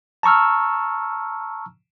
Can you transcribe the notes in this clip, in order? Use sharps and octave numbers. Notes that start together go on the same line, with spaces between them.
A5 A#5 C#6 E6 F6